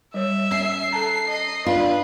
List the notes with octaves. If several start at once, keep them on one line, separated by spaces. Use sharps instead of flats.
G3 C#5 E5
C#4 C7
A4 A5 A#5
D#5
D4 F4 B4